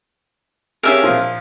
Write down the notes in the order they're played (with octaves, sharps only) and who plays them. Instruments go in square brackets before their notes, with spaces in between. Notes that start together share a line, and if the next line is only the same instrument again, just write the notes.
[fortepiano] C#4 G4 G#4 [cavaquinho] A#4 E5 F5
[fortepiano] A#2 F3